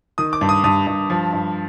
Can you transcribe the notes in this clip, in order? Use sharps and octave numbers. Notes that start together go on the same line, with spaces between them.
D#3 D#6
D6
G2
D#6
G2 D#6
G2
F3
G2